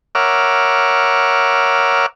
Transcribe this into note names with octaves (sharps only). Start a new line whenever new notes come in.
A#4 C#5 E5 F#5 D6 F6